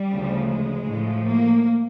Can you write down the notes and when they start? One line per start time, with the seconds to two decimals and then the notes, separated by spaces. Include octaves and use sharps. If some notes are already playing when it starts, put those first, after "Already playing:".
Already playing: G3
0.12 D2 C#3 F3
0.50 G#3
0.88 A2 F3
1.25 A#3